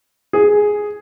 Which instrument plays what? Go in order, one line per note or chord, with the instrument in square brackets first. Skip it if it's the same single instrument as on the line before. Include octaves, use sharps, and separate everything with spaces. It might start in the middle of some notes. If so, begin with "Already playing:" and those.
[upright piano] G#4